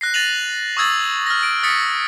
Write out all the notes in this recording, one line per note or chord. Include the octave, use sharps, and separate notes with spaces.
F#6 A#6 C7
A6 A#6 D#7 F7 F#7
C#6 D#6 E6 G#6 A6 F#7
F6 A#6
D7
D#6 A6 B6 C#7